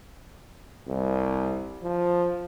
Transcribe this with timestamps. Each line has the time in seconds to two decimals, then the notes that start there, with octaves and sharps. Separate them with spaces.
0.88 C2
1.83 F3